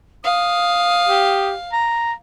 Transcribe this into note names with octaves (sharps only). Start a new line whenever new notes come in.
F5 D#6
G4
A#5